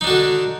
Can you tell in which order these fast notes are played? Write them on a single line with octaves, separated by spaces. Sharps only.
D#4 D4 F#4 D3